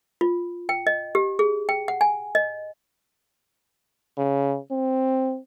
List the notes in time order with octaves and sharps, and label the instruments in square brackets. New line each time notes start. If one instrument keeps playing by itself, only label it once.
[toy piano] F4
G5
D#5
G4
G#4
G5
F#5
G#5
D#5
[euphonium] C#3
C4